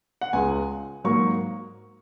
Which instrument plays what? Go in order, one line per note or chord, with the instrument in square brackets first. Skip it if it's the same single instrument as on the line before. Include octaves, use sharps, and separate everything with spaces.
[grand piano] F#5
C#2 C#3 G#3 G#5
G#2 F#3 A#3 C#6